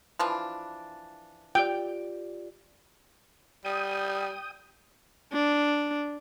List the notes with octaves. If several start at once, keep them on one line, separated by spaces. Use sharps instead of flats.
E3 F3 D4
F4 G4 D5 G5
G3 G5 D#6
D4